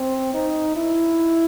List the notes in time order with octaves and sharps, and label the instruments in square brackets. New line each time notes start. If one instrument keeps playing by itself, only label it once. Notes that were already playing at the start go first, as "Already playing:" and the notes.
Already playing: [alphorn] C4
D#4
E4